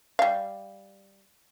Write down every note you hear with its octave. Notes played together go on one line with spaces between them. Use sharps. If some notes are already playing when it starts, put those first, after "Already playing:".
G3 F5